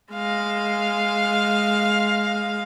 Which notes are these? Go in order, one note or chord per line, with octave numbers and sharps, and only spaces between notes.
G#3 F5